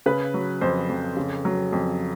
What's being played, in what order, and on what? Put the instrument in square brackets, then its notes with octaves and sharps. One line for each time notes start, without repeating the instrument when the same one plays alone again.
[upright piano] C#3 B4
F#3
F2 C5
F2
C#3
F#3
F2